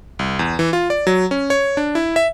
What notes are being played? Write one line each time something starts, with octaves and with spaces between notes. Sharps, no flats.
C2
E2
E3
F4
D5
F#3
C#4
C#5
D4
E4
E5